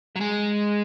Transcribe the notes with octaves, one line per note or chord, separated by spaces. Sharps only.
F#3
G#3